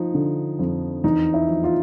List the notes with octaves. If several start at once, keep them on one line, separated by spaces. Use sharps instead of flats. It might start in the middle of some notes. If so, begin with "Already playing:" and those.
Already playing: F3 D#4
D3
F2
E2 D#4
E4
F3
F4